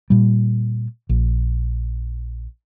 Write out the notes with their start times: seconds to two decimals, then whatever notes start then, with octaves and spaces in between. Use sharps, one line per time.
0.10 A#2 G3
1.09 A#1